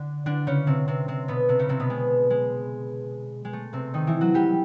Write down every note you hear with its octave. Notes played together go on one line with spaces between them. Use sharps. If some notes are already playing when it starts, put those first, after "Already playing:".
Already playing: D3 D4
D3 D4
C#3 C#4
C3 C4
C3 C4
C3 C4
B2 B3
C3 C4
C#3 C#4
C3 C4
B2 B3
G#3
G#3
G#3
A3
C3 C4
D#3 D#4
E3 E4
F#3 F#4
G3 G4